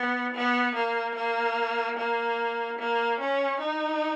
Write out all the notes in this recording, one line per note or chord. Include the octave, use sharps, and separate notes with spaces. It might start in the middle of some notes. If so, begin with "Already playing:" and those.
Already playing: B3
B3
A#3
A#3
A#3
A#3
C#4
D#4